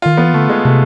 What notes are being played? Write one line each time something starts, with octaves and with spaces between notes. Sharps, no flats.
D#3 F4
E3 B3
D3 A3
G#3
C3 A3